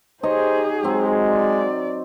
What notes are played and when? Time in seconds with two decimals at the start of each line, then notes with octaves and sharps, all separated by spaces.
0.23 D#4 G4 G#4 C5 C#5 D#5
0.83 F#3 G#3 C4 C5
1.28 D5